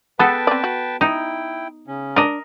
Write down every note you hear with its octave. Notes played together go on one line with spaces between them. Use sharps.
B3 G#4 A4 B4 G5 A5
C4 D5
F#4
D#4 E4 G5
C#3 C#4
D4 A#4 D5 D#5